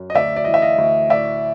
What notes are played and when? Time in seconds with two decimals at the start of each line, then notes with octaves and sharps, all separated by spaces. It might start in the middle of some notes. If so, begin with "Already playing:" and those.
Already playing: F#2
0.10 D#5
0.15 D2 D5 E5
0.36 D5
0.45 E3 D#5
0.54 E5
0.62 D#5 F5
0.78 D2
1.09 A2 D5 E5